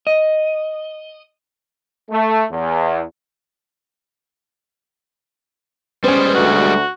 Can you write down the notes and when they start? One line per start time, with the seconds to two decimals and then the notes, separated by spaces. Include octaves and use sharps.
0.07 D#5
2.11 A3
2.51 E2
6.04 G3 G#3 B3 C#4 C5
6.35 D2 F#4